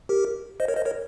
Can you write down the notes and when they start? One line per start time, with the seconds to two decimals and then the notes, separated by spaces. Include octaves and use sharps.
0.09 G4 A#4
0.60 C5 D#5
0.68 A#4 C#5
0.76 C5 D#5
0.85 A#4 C#5